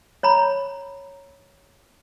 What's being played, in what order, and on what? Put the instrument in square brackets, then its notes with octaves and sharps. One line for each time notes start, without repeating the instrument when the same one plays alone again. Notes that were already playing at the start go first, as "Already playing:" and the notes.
[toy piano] C#5 A#5 B5